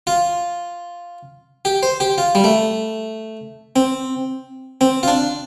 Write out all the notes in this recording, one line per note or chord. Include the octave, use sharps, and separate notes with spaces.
F4
G4
C5
G4
F4
G3
A3
C4
C4
F4
D4